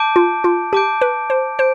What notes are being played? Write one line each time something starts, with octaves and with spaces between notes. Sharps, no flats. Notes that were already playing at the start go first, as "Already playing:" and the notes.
Already playing: A5 D6 G6 D7
F4
F4
G4 A5 D6 G6 D7
B4
C5
C5 G6 D7